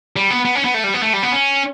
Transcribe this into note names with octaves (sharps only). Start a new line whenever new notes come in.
G3
B3
B3
C#4
B3
A3
G3
B3
A3
G3
B3
C#4